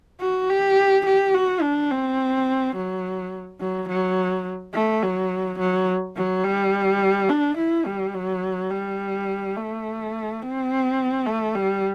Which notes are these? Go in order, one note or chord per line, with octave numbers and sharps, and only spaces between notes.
F#4
G4
G4
F#4
D4
C4
F#3
F#3
F#3
A3
F#3
F#3
F#3
G3
D4
E4
G3
F#3
G3
A3
C4
A3
G3